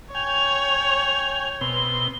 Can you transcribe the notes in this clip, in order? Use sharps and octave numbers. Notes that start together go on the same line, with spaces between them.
C#5 G5 G#5 F7
B2 C4 G7